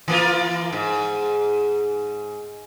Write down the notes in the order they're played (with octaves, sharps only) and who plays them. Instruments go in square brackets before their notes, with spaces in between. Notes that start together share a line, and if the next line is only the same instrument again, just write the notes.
[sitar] E3 A#3 F4
G#2